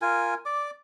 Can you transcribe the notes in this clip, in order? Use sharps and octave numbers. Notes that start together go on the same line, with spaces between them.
F4 A#4 G#5
D5 D6